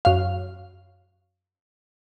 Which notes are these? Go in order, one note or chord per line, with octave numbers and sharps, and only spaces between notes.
F#2 F5